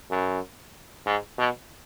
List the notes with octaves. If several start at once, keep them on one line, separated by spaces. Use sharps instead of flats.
F#2
G#2
B2